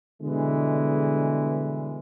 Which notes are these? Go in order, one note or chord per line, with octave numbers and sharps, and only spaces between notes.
B2 D3 E3 G3 G#3